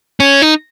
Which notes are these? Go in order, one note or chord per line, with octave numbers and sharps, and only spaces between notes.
C#4
D#4